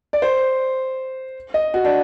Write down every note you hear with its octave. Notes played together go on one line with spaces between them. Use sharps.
D5
C5
D#5
F#4
D4